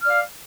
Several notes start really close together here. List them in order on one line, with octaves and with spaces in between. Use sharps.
F6 D5 F5